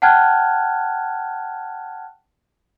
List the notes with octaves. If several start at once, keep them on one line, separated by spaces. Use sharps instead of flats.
F#5 G5 A5 F6 F#6 G#6